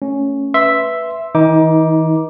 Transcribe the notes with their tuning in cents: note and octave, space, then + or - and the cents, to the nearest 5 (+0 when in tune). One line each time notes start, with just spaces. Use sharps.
A3 +20 C#4 +0
B4 +0 E5 +0 C6 +0
E3 -45 D#4 +25 D6 +0